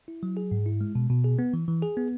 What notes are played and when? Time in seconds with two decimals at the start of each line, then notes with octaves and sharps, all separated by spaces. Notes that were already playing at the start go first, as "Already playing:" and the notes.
0.08 E4
0.23 F#3
0.37 G#4
0.51 G#2
0.66 E4
0.81 G#3
0.95 B2
1.10 B2
1.24 G#4
1.39 B3
1.54 E3
1.68 E3
1.82 G#4
1.97 B3